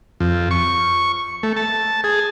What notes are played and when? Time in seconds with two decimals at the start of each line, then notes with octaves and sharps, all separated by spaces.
0.20 F2
0.51 C#6
1.43 A3
1.57 A5
2.04 G#4